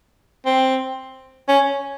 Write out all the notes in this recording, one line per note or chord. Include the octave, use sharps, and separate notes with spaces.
C4
C#4